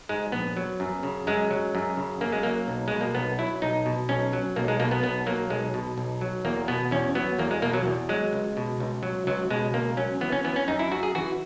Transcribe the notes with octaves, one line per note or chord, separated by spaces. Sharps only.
G#2 G#3
A#1 B3
F#3
F#2
C#3
F#2 G#3
F#3
F#2
C#3
F#2 A#3
G#3
F#3 A#3
B1
B2 G#3
A#3
B1 B3
F#3 E4
B1 D#4
B2
B1 C#4
F#3
B1 A#3
G#3
B2 A#3
B3
B1 B3
F#3 A#3
B1 G#3
B2
B1
F#3
E2 A#3
B2 B3
E2 C#4
F#3 B3
E2 A#3
G#3
B2 A#3
F#3
E2
F#3 G#3
C#2
B2
C#2
F#3
C#2 F#3
B2 G#3
C#2 A#3
F#3 C#4
E3 B3
C#4
E3 B3
C#4
F#2 D#4
E4
F#2 F#4
G#4
E3 F#4